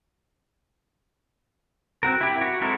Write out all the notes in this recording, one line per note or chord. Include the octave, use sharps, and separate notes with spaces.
C4 F#4 A#4
E4 G4
F#4
G#3 C4 E4 A4 A#4